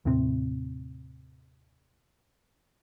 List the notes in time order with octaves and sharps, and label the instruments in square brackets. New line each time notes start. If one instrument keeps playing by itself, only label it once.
[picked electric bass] D#2 A2 C3 C4